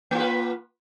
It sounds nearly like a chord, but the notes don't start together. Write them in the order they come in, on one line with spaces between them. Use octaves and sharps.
A#3 F4 B4